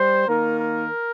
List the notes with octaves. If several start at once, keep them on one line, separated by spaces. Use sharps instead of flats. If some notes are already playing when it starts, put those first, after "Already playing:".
Already playing: G3 C5
D#3 A#3 A#4
A#4